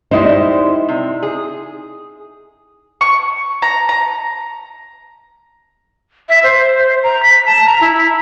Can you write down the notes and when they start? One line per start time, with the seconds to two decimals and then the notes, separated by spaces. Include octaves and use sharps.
0.11 G3 G#3 D#4 E4 C5
0.89 C3
1.23 G#4
3.01 C#6
3.62 A#5
3.89 A#5
6.29 E5
6.44 C5
7.03 A#5
7.23 B6
7.46 A5
7.66 A#5
7.81 E4